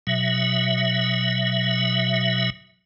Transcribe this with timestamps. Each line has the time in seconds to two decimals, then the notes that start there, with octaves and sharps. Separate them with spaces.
0.07 B2 F#3 E5